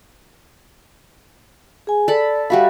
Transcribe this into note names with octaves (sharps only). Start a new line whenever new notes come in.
G#4 G#5
A4 D5 B5
G3 F#4 E5 F5 B5